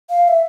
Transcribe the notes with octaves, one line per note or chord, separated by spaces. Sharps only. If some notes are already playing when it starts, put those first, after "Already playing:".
F5
E5